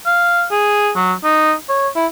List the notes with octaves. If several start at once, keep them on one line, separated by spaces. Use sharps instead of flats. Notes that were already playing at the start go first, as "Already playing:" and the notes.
F5
G#4
F#3
D#4
C#5
E4